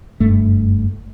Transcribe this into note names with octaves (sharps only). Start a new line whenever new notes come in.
F#1 G2 A3